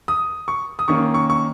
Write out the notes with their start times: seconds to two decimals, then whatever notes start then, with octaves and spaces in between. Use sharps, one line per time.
0.08 D#6
0.48 C#6
0.79 D#6
0.88 D#3 A#3 C#4 C#6
1.14 C#6
1.30 C#6